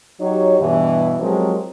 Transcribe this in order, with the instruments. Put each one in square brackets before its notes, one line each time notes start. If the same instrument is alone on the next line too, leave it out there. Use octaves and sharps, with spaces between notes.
[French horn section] F#3 D#4 F#4 G4 C#5
G2 B2 E3
F3 F#3 G#3 C4 G4 A#4